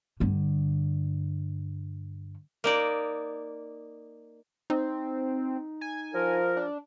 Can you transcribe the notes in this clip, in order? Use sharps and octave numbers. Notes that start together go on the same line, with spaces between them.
G2 D3
A#3 D#4 D5
C4 D#4
G#5
F3 A#4
D4